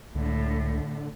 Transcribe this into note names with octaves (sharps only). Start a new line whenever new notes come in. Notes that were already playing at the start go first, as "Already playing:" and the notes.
C#2 A2 D3